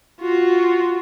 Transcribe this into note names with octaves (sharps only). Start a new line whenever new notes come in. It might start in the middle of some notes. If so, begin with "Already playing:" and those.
F4 F#4